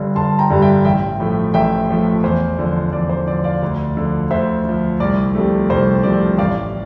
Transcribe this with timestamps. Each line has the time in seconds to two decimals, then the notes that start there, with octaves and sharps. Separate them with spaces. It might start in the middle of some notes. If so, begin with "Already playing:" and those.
Already playing: G1 G2 D3 G3
0.16 G1 A5 C6
0.39 G5 A#5
0.50 G2 D3 G3
0.62 E5 G5
0.85 A1 E5 G5
1.20 A2 F3 A3
1.54 A1 E5 G5
1.89 A2 F3 A3
2.24 E2 C5
2.59 D3 F3
2.93 E2 D5
3.09 C5
3.27 D3 F3 D5
3.44 D5 F5
3.62 D2
3.97 D3 F3
4.31 D2 C5 E5
4.65 D3 F3
5.00 C2 D5
5.35 C3 F3 A3
5.70 C2 C5
6.03 C3 F3 A3 D5
6.38 A1 D5 F5